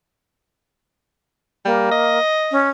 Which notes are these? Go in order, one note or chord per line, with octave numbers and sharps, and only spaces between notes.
G3 A#3
D#5
C#4